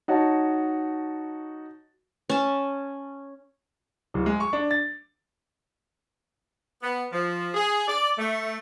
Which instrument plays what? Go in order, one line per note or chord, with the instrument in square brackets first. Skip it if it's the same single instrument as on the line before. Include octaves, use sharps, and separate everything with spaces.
[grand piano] D#4 F#4 C#5 A5
[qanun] C#4 A5
[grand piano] D1
G#3
C#6
D4
A6
[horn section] B3
F3
G#4
D5
A3